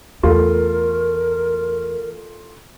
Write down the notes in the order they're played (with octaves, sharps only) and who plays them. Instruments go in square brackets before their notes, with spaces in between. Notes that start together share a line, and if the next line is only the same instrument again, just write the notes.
[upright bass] E2 [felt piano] A3 F4 [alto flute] A#4